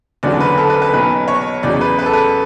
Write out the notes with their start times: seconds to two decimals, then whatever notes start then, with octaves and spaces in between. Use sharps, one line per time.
0.23 F#1 E2 D3 F#3 D5
0.40 B4
0.58 A4
0.70 B4
0.82 B4
0.93 B1 B2 F#3 B4
1.28 C#5
1.63 E2 C#3 F#3 D5
1.81 B4
1.99 B4
2.06 A4
2.13 B4